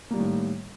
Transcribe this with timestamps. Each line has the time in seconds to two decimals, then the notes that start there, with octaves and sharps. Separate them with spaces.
0.11 A#3
0.14 G3
0.17 D#3
0.20 A2